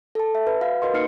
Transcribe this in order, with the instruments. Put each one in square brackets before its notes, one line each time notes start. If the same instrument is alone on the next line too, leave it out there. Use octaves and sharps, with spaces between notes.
[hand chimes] A4 A5
E5
B4
F#4 B4 F5
F#4 A#4 B4 D#5 C6
A#3 D#4 F6 C7 C#7